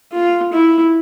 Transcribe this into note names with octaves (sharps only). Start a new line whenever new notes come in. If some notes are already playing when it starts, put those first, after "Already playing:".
F4
E4